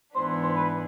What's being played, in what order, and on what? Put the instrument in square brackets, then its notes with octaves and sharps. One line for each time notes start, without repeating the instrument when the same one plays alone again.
[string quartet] G#2 E3 B3 D4 [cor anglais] C5
[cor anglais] C5
B4